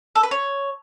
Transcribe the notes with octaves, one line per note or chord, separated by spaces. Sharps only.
A4
B4
C#5